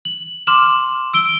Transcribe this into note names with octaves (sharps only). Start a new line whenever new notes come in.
F#7
C6 D6 F6 E7 F#7
E6 D7 G7